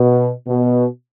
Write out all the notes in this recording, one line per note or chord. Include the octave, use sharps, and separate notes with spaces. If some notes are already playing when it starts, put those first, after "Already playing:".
Already playing: B2
B2